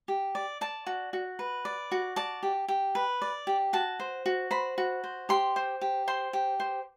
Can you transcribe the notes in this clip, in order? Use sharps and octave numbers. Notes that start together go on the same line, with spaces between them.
G4
D5
D5 A5
F#4
F#4
B4
D5
F#4
D5 A5
G4
G4
B4
D5
G4
F#4 A5
C5
F#4
C5 B5
F#4
C5
G4 C6
C5
G4
C5 C6
G4
C5